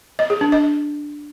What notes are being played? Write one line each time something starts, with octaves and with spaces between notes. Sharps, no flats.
D#5
G#4
D4
D#5